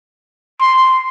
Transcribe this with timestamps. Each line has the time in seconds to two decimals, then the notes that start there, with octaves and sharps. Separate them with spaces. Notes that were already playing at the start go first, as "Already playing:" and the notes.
0.61 C6